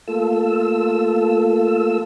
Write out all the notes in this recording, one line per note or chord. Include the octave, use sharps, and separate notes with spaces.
A3 A#3 F4 A4 E6